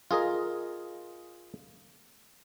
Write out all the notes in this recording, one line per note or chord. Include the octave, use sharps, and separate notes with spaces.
F4 G#4 A#4 D#5